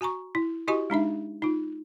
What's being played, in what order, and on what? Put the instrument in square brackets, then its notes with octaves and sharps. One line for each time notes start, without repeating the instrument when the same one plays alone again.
[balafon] F#4 G#5 A#5 C#6
E4
E4 F#4 G4 D#5 G#5 C#6
G#3 D4 D#4 E5
D#4 F4